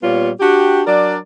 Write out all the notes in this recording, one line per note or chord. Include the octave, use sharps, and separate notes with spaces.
A#2 G3 B3 F4 C#5
D4 F#4 G4
F#3 D4 A#4 D5